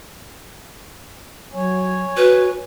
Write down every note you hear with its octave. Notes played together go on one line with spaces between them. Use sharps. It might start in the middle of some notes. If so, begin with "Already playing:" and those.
F#3 C#5 G#5
F#4 B4